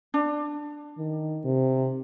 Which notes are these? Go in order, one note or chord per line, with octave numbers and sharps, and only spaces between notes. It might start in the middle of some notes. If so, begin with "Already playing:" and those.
D4
D#3
C3